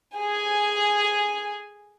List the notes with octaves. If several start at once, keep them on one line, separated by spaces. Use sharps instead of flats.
G#4 G#5